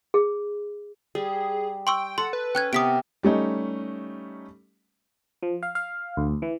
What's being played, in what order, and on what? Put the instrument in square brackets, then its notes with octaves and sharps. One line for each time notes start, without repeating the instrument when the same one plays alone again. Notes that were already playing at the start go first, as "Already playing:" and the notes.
[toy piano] G#4
[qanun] G3 [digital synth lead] G#4
[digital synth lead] G5 [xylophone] C6 C#6 E6
[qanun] A4 [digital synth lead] F#5 [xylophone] C6
[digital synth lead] B4
[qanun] C#4 [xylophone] G5 F#6 G#6
[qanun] C3 G4 A#4 [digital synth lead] B3 [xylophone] D#6 B6 D7
[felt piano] G3 A3 C#4 D#4
[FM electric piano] F3
F5
F5
D2
E3